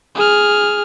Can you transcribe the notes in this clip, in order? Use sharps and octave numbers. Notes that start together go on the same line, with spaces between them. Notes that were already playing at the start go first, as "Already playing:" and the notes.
G#4 F6